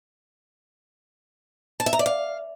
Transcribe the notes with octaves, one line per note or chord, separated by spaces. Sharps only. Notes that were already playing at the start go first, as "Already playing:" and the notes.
A5
E5
A#5
D5
F5